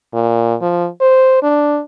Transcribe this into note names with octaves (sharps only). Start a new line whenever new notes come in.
A#2
F3
C5
D4